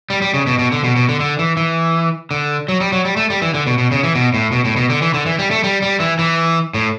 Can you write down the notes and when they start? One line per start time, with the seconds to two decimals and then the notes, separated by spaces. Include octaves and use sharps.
0.10 G3
0.22 G3
0.34 C#3
0.47 B2
0.59 B2
0.72 D3
0.84 B2
0.96 B2
1.09 D3
1.20 D3
1.39 E3
1.57 E3
2.31 D3
2.68 F#3
2.80 G3
2.92 F#3
3.05 G3
3.17 A3
3.30 G3
3.42 E3
3.54 D3
3.67 B2
3.78 B2
3.92 C#3
4.03 E3
4.15 B2
4.34 A2
4.52 B2
4.65 A2
4.76 B2
4.90 D3
5.02 E3
5.14 D3
5.26 E3
5.39 G3
5.51 A3
5.64 G3
5.82 G3
6.00 E3
6.19 E3
6.74 A2